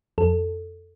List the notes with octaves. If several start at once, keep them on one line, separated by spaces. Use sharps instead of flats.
F2 A4